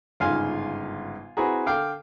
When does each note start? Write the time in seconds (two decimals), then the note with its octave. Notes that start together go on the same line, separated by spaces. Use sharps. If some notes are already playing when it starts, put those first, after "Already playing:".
0.20 G1 G#2 C#3 F4 F5 G#5
1.37 C4 E4 F#4 G#4 B4 A#5
1.66 D3 F5 G5 D6